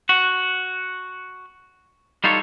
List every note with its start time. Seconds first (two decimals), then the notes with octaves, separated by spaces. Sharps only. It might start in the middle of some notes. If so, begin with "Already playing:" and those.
0.09 F#4
2.24 G3 D#4 F4 A4 C#5